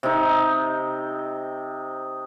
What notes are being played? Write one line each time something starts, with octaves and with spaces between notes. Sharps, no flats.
C3 D#4